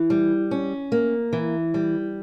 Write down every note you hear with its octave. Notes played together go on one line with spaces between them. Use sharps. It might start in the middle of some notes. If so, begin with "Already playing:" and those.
Already playing: E3
G3
C#4
A#3
E3
G3